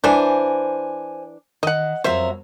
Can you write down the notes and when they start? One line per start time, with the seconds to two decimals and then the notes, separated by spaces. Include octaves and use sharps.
0.04 E3 D4 C5 G#5
1.63 D#3 D#5 F#5
2.04 F2 F#3 A#4 C5 E5